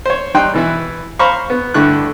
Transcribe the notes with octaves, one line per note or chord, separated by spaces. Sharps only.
C5 C#5
G3 D#4 G5 C6 F#6
B2 E3 E4
C5 F5 A#5 B5 C#6
B3
G2 D3 A3 E4 C#6 F#6